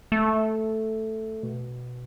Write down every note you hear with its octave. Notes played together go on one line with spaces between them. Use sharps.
A3
B2